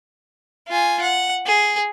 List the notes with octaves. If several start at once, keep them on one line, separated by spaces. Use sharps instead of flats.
F4 G#5
F#5
G#4